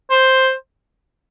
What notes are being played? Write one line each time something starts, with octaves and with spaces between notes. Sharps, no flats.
C5